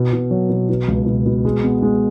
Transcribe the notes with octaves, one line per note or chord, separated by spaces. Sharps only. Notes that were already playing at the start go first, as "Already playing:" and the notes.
Already playing: B2
B2
F#3
B2
B2
C#2
B2
B2
G#3
B3
G#3